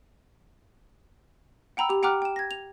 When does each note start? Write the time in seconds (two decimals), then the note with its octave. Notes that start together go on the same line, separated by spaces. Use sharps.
1.77 F#5 G5 A#5 B5 E6
1.89 G4 F7
2.03 F#5 G5 A#5 D6 F6 F#6
2.22 G5 E7
2.36 G#6 A#6
2.51 F7